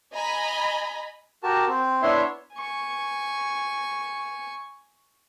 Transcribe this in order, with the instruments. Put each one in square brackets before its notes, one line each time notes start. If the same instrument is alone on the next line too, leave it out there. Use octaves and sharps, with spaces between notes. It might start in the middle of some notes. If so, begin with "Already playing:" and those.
[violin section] D#5 G#5 A#5 B5
[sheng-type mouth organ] F#4 G4 A#4 A5
C4
B3 D4 E4 C#5 E5 C6
[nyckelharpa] G#5 C#6